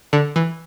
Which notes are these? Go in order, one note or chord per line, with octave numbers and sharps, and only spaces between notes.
D3
E3